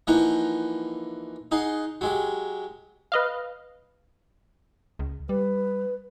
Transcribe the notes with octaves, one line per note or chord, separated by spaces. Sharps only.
E3 F3 A#3 D#4 F#5 A#5
D#4 G#4 F#5 C6
F#3 G#3 G4
B4 D#5 F5
C#2
G3 B4